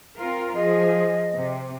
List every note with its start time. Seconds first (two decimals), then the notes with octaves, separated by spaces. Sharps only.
0.16 C4 F4 A#4
0.55 F3 G#4 D#5
1.34 C3